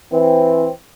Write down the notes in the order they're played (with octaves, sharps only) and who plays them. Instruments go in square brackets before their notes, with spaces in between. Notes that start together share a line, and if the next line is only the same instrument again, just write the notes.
[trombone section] E3 C4